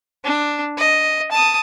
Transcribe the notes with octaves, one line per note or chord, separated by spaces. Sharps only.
D4
D#5
A5 D#6